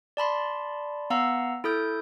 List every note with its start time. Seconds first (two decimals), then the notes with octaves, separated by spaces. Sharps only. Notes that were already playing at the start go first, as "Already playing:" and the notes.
0.17 D5 A5 B5 C6
1.10 B3 F5 F#5 A#5 E6
1.64 E4 A4 D#6 G6